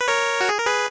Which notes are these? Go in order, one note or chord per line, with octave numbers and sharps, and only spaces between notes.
B4
A#4 C#5
F#4
G#4
A#4
G#4 B4